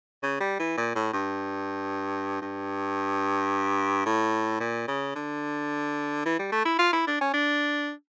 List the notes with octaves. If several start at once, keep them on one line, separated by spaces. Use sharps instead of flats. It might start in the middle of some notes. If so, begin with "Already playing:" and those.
C#3
G3
E3
A#2
A2
G2
G2
A2
A#2
C#3
D3
E3
G3
A3
E4
F4
E4
D4
C#4
D4